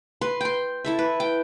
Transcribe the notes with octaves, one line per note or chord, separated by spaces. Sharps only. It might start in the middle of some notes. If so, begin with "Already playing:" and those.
B4 C6
G5 C6
E4 A4 E5
B4
G5